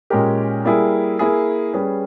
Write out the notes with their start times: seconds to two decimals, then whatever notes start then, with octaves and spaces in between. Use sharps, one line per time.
0.10 A#2 G#3 C#4 G4 A#4
0.65 G3 A#3 E4 G#4
1.19 A#3 E4 G#4
1.73 G3 C#4 G#4 B4